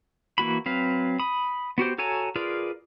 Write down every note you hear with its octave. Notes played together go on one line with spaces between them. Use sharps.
E3 A#3 F#4 B5
F#3 C4 B4 F5
B5 D#6
B3 F#4 G4 C5
F#4 A4 C#5 G#5 A#5
F4 G#4 A#4 B4 D5